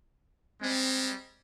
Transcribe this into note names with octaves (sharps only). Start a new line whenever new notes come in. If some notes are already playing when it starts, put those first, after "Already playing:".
G3 G#3 C4